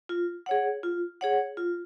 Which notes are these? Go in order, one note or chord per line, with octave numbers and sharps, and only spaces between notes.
F4
G#4 C#5 F#5
F4
G#4 C#5 F#5
F4